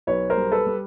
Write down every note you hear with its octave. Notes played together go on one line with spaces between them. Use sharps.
B1 B4 C#5
A#4 C5
G3
A4 B4
G3